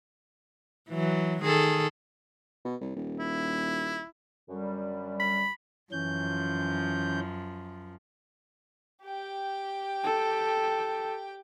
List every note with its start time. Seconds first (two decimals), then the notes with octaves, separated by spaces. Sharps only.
0.90 E3 F#3
1.42 D#3 G#4 A4
2.65 B2
2.81 C2
2.96 D#1
3.19 E4
4.49 F#2 D3 G3
5.20 B5
5.92 F#2 E3 F3 C#4 G6
9.04 G4 G5
10.04 A4